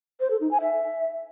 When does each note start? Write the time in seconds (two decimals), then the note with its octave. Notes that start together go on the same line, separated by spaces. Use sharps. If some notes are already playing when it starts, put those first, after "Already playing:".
0.20 C5
0.30 A4
0.41 D#4
0.51 G#5
0.61 E5